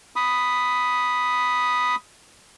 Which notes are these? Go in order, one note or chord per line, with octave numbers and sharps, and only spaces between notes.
B5 D#6